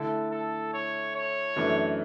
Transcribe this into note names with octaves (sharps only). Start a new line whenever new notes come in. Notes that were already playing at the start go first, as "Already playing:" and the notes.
Already playing: D3 A3 E4 A4
A4
C#5
C#5
F#2 E3 A3 D4